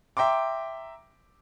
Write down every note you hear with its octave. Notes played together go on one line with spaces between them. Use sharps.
E5 G5 A#5 C6 D6